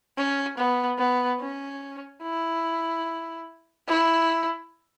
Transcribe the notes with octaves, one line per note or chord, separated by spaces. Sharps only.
C#4
B3
B3
C#4
E4
E4